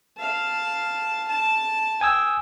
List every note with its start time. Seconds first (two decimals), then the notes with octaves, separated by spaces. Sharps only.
0.17 F5 A5
1.28 A5
2.01 G5 G#5 D#6 E6